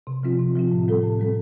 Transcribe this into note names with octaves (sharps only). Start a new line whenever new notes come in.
C3
F3 C4 F4
C3
F3 C4 F4
A2
G3 C4 A4
A2
G3 C4 A4